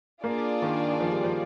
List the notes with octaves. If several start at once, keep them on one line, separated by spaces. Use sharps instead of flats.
A#3 D4 F4 G#4 D5
D#3
F3
G3
F3